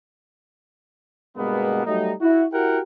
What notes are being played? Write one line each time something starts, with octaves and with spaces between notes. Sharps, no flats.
G2 B2 G#3 A#3 B3
F#3 G3 A3 D#4
E4 F#4
E4 F#4 G4 A#4 F#5 G5